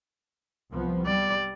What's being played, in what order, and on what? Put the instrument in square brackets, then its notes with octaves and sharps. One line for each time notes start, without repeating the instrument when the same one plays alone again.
[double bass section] C2 F3 B3
[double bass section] G3 [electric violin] D5